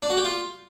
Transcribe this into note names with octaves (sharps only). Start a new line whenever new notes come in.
D4
F#4
G4
F4